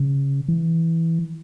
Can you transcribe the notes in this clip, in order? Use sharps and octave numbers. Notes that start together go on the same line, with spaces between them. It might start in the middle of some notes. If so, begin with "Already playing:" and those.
Already playing: C#3
E3